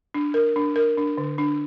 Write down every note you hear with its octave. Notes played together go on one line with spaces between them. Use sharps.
D4
A#4
D4
A#4
D4
D3
D4